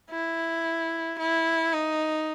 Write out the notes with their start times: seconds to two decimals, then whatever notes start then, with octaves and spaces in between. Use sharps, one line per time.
0.10 E4
1.19 E4
1.73 D#4